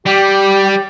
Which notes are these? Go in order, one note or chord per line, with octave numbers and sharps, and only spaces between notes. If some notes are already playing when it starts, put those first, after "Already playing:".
G3 G4